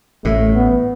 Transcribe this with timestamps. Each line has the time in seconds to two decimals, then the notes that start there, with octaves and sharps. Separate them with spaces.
0.25 A1 A2 A3
0.55 B3